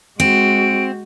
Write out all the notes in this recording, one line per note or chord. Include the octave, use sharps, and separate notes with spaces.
G#3 C4 F#4 D7